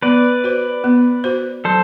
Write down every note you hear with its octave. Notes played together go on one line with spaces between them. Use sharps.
B3 B4 D5
F#4 C5
B3
F#4 C5
F#3 A4 C5